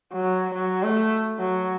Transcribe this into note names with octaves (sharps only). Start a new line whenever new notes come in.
F#3
F#3
A3
F#3